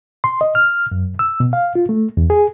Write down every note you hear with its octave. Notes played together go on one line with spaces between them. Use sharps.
C6
D#5
F6
F#2
E6
B2
F5
F4
A3
E2
G#4